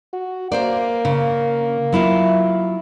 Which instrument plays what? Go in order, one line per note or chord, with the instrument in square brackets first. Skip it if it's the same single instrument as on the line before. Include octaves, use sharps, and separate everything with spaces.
[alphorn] F#4
[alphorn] A#3 [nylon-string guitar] A#4 C5 D5
[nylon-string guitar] C#3
F#3 E4 F4